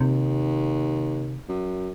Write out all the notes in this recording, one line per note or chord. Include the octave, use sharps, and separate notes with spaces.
D#2 C3
F#2